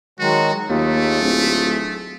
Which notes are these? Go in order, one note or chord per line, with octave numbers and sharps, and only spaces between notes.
D#3 F#3 G#3 F#4
D#2 A3 F4 G#4
D1